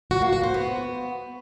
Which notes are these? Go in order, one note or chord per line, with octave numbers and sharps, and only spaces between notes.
F#4
A#3
F#4
C5
B3